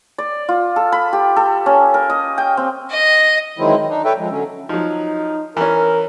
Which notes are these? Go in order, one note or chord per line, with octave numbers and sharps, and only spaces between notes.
D5
F4
A4
B5
G4
A4
C#4
A#4
D#5
G5
C4
D#5
D#3 E3 F#3 G#3 C4 E4
D#3
D4 D#4
A4 B4 C#5 E5 G5
F3 G#3
D3 F#3 C#4
F3 F#3 D#4
E3 C#4 A#4